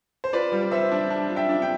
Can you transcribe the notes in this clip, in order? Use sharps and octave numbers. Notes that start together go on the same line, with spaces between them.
C5
F4 B4 D5
G3
G3 C5 E5
D4
D4
F4
E5 G5
D4
G5